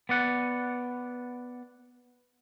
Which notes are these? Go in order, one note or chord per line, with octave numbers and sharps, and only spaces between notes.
B3 D5 F#5